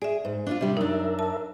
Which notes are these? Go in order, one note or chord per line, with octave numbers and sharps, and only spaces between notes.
G#4 D5 E5
G#2
D4 D#4 F4
C3 G3 D4
F#2 D4 D#4 A#4 E5
A5